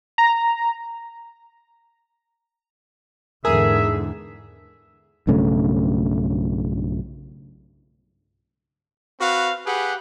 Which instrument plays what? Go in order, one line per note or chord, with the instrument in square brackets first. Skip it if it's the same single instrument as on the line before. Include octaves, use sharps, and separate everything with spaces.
[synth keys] A#5
[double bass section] E2 G#2 D3 [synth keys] G#4 [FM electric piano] A#4 [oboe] E5
[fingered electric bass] B1 G2 C#3 A3
[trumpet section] C4 F#4 B4 F5
G4 G#4 B4 F#5